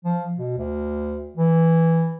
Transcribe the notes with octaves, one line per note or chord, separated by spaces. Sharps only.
F3
B2
D2
E3